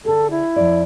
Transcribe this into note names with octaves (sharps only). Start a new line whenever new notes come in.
D3 G#4 A4
E4
F2 A#2 D5